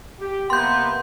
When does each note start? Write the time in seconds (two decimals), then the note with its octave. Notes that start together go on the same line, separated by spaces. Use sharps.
0.20 G4
0.50 C3 A#3 B3 C6 G6